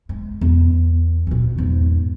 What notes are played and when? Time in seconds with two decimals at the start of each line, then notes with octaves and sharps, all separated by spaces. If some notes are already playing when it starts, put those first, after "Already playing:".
0.09 G#3
0.41 E2
1.27 D2 A#2
1.57 E2 G#2